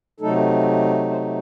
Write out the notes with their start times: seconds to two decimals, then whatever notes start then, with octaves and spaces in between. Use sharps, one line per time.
0.20 C3 F#3 A3 D#4 A4
1.10 C5